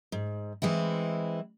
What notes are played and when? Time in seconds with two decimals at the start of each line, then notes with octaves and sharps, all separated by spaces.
0.12 G#2
0.62 E3 G#3 C4 E4